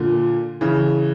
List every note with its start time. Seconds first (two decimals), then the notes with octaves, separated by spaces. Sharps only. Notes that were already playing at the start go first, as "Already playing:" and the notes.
Already playing: A#2 D3
0.61 C#3 E3